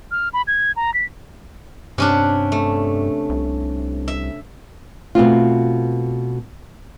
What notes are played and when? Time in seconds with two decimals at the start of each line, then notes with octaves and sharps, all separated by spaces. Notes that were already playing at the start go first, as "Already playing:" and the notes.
0.11 F6
0.33 B5
0.47 G#6
0.76 A#5
0.94 B6
1.98 G2 C3 C#4 D4
2.52 A3
3.29 C2
4.08 E5
5.15 B2 A3 C4 F4